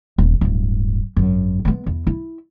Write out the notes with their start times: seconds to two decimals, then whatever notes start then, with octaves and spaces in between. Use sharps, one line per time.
0.18 D#1
0.41 D1 G2
1.17 G#1 F#2
1.65 G#3 B3
1.87 E2
2.07 E4